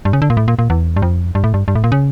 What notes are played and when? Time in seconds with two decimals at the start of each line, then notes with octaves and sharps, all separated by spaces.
0.05 G2
0.13 C#3
0.22 D3
0.30 A#2
0.37 A2
0.48 A#2
0.59 A#2
0.70 E2
0.96 G2
1.02 F2
1.35 G2
1.44 A2
1.54 G2
1.68 G2
1.75 A2
1.84 A#2
1.92 C#3